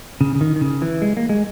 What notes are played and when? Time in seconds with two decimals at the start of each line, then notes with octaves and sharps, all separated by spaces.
0.21 C#3
0.35 C#3
0.41 D#3
0.56 D#3
0.61 C#3
0.82 E3
1.02 G#3
1.17 A#3
1.29 G#3